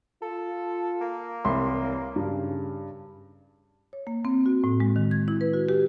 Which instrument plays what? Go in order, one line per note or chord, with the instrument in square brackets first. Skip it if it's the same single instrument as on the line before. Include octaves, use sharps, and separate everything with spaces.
[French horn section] F4 [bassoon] A4
[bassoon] A#3
[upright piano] C2 B5 C6 [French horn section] E3 G3 C#5
[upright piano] G2 [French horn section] C#3
[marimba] C#5
A#3
C4
F#4
A2
G#3
D#3
G#6
E4
B4
F#4
G4